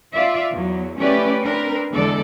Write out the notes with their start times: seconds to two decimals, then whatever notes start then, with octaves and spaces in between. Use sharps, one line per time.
0.13 F4 D5 E5
0.52 E2 F#3
0.97 A3 C#4 E4 G4 B4 D5
1.42 C4 D4 A#4 B4
1.91 E2 D3 G#3 A4 D5